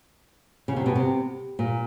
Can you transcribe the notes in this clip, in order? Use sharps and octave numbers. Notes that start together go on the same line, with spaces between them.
C#3
C3
B2
C3
A#2